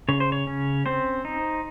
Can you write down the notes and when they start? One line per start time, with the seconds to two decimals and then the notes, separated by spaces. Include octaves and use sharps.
0.09 C#3 C#5
0.20 C5
0.32 C#5
0.47 C#4
0.86 C4 C5
1.25 D#4